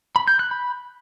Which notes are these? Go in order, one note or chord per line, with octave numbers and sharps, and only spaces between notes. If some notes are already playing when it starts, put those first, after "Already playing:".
B5
G6
F#6
B5